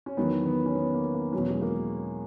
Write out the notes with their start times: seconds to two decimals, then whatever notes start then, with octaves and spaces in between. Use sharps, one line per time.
0.06 C#4
0.17 E2 D#3 F#3 B3
0.46 B3
0.66 C#4
0.75 B3
0.94 A#3
1.14 A#3
1.33 E2 B2 F#3 C#4
1.50 G#3
1.62 A#3